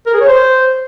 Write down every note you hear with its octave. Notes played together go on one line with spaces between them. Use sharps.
A#4
G#4
C#5
C5